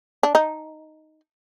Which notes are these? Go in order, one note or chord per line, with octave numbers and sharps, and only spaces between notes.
D4
D#4